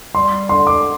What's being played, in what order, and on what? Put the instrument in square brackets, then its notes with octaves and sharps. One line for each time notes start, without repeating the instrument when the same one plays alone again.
[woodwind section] G3 [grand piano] C6
[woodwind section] D3 [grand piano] C6
[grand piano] D6